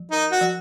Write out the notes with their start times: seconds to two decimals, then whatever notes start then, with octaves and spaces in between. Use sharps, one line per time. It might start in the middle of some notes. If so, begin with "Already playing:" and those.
Already playing: F3
0.11 D#4 A#4
0.31 F#4
0.41 F3